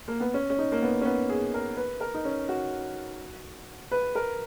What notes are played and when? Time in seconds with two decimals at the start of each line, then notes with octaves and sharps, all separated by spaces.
0.08 A#3
0.20 B3
0.34 C#4
0.50 C#4
0.59 D#4
0.72 A#3
0.83 B3
1.01 C#4
1.05 B3
1.29 G#4
1.54 A#4
1.77 B4
2.00 A#4
2.14 D#4
2.25 C#4
2.49 F#4
3.91 B4
4.15 A#4